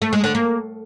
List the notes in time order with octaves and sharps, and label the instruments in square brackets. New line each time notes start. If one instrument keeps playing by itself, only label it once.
[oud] A3
G#3
D3
A#3